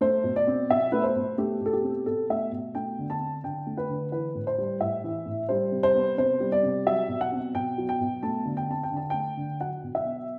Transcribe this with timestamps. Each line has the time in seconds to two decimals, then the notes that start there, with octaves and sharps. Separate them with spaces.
0.01 A3 C5
0.24 B2
0.36 D5
0.47 C4
0.70 B2 E5
0.92 A3 B4
1.04 C5
1.16 B2
1.38 A3 G4
1.61 B2
1.66 A4
1.73 G4
1.83 C4
2.06 B2 A4
2.30 A3 E5
2.52 B2
2.75 A3 G5
2.99 D3
3.10 A5
3.20 C4
3.44 D3 G5
3.67 A3
3.77 B4
3.89 D3
4.12 E3 B4
4.35 A2
4.47 C5
4.58 G3
4.81 A2 E5
5.04 E3
5.26 A2
5.49 G3 C5
5.72 C3
5.83 C5
5.95 B3
6.17 C3 C5
6.40 G3
6.52 D5
6.63 C3
6.86 F#3 E5
7.08 B2
7.21 F#5
7.32 C4
7.54 B2 G5
7.78 F#3
7.89 G5
8.01 B2
8.23 A3 A5
8.45 D3
8.57 G5
8.68 C4 A5
8.83 G5
8.91 D3
8.97 A5
9.10 A3 G5
9.37 D3
9.61 F#3 F#5
9.83 B2
9.95 E5
10.05 B3